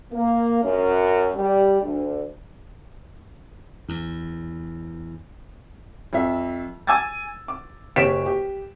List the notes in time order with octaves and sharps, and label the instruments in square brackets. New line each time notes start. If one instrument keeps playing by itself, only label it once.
[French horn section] A#3
F#2
G3
D2
[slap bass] E2
[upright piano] F2 E5
G#5 D6 E6 G#6 A6
D6
F#1 G4 C#5 B6 D7 E7
G4